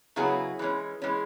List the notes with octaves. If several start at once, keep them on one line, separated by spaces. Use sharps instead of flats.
C#3 F#3 B3 E4 G#4
E3 G#3 C#4
E3 G#3 C#4